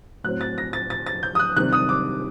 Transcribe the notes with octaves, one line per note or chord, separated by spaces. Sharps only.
A2 F#3 C4 F#6
A6
A#6
A6
A6
A6
G6
D#6
F#6
C3 D#3 G3 C4 F#6
D#6
D6